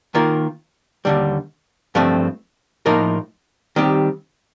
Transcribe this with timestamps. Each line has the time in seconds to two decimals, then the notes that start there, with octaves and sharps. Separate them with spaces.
0.15 D#3 A#3 F4 A#4
1.05 D#2 D3 G3
1.95 G2 F3 A3 C4
2.86 A2 F3 A#3 D#4 A#4
3.76 D#3 G3 C4 G4